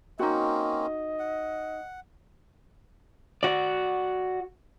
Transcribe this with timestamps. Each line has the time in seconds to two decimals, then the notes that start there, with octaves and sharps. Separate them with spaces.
0.19 A#3 C4 C#4 D#4 F#4 D#5
1.19 F#5
3.43 F#4 D5